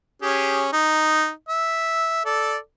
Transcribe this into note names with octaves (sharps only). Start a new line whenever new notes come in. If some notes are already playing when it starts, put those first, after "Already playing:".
C#4 G4 G#4
D#4
E5
A4 D5